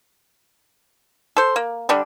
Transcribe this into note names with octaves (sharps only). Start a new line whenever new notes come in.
A4 C5
A#3
D3 G3 D4